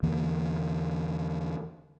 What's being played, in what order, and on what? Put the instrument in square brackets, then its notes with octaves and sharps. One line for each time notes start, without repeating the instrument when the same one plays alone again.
[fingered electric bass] E2 D3 E3 A#3